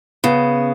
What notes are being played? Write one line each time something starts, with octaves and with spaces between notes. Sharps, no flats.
C#3 B3